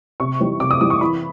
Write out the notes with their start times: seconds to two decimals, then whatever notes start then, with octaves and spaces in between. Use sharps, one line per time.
0.20 C3 C#6
0.40 E3 G3 C4 D#4
0.60 C3 D6
0.71 D#6
0.81 E3 G3 C4 D#4 D6
0.90 C#6
1.01 E3 B5